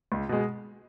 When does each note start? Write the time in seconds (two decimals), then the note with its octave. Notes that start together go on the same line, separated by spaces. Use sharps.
0.12 C#2
0.29 B2 G#3